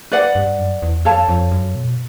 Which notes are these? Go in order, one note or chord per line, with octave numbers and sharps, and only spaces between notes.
B4 D5 F#5
G2
F#2
E2
F2 A4 C#5 F5 A5
F2
F#2
B2